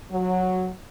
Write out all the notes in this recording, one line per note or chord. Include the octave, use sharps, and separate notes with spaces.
F#3